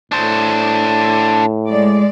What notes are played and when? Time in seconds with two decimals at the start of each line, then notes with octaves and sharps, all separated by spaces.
0.12 A2 D4 C5
1.69 G#3 D5